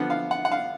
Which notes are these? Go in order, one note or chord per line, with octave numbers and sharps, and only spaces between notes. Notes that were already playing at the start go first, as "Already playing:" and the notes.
Already playing: D3 F3 B3 F#5
F5
F#5
F#5
F5